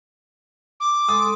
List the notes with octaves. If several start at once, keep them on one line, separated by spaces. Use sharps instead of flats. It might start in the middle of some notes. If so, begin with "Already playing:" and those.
D6
G#3 A4 C6 D#6